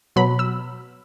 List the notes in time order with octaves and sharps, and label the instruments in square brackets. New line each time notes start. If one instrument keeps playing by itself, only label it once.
[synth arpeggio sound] B2 F#3 B5
E6